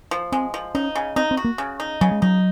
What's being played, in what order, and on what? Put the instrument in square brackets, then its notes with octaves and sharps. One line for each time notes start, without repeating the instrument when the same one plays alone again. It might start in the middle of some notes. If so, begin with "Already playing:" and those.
[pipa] F3
[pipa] G#3 [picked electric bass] C4
[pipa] F3
[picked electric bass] C#4 [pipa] D#4
[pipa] C#3
[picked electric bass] C4 [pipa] D#4
[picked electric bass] C4
[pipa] F#4
[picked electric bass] A#3
[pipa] C#3
D#4
[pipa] C#3 [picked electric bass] F#3
[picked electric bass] G#3
[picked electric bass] F#3 [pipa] D#4